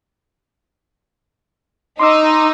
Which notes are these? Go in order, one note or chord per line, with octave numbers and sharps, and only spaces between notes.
D#4 C6 D6 E6